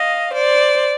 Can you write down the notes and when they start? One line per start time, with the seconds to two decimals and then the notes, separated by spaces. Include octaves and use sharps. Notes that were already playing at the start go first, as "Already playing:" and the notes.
Already playing: D#5 F5
0.34 C5 D5